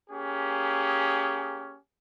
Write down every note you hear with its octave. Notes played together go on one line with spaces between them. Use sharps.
A#3 C#4 G4 G#4